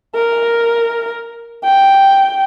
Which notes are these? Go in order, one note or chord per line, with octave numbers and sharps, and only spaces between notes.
A#4
G5